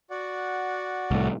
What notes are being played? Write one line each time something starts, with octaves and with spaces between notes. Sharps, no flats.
F#4 D5 F#5
C2 A2